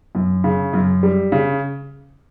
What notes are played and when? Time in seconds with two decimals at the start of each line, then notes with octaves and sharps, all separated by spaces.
0.15 F#2
0.44 C#3
0.73 F#2
1.03 G3
1.32 C#3